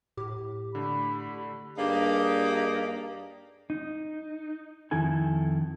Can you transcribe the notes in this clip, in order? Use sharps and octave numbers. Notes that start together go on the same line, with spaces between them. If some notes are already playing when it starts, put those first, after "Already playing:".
A2 G4
D3 A3 B5
G2 A#3 D#4 G4 G#4 D5
D#4
F2 D#3 E4 A4 G#5